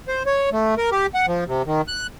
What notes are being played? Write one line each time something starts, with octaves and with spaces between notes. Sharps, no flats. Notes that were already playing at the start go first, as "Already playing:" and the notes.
C5
C#5
A3
A#4
G4
F#5
F3
C3
D#3
F#6